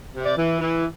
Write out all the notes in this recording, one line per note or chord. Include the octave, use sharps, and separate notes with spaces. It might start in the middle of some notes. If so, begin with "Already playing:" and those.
C3
D5
E3
E3